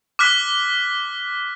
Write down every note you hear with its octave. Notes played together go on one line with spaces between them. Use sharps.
D6 F6 F#6 B6